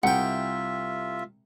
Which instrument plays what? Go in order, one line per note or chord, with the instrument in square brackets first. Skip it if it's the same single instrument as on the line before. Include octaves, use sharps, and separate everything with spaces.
[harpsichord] C2 G5 [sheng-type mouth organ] F4 E5 [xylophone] F#5